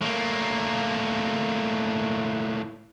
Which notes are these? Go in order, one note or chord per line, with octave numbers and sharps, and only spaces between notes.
A2 A#3